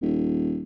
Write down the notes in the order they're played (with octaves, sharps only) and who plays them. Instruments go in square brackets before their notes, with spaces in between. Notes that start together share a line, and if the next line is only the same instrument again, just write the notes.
[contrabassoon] D#1